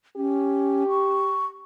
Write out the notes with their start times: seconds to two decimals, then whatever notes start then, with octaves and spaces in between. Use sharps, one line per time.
0.16 C#4 G4
0.89 C#6